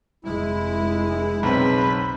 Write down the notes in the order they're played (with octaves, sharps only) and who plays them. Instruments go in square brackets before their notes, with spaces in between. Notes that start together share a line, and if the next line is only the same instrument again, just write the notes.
[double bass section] F1 G#3 [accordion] E4
[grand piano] B1 C4 [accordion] C#3 [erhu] B4